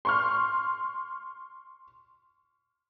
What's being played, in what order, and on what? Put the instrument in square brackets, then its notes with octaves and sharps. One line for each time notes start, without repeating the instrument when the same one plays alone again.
[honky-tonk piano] C6 C#6 F6